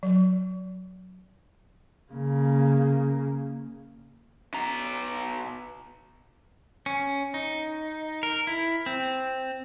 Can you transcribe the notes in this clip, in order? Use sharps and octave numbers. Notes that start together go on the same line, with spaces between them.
F#3
C#3 A#3
B2 A#5
C#4
D#4
A#4
E4
C4